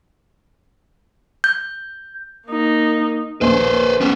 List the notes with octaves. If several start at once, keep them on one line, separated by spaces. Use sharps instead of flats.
G6
A#3 D#4
A#1 D#2 B4 C5
B3 C#4